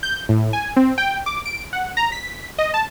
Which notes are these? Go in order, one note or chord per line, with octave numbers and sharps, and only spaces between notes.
G6
A2
G#5
C4
G5
D6
D7
F#5
A#5
B6
D#5
A5